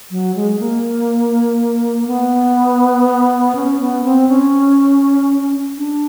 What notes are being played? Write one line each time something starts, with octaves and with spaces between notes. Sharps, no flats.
F#3
G#3
A#3
B3
C#4
B3
C4
C#4
D4